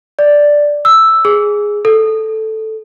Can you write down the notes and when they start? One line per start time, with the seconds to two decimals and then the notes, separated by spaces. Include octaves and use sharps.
0.19 D5
0.85 E6
1.25 G#4
1.85 A4